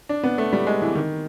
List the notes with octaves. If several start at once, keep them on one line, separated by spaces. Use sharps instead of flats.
D4
B3
A3
G3
G#3
E3
D#3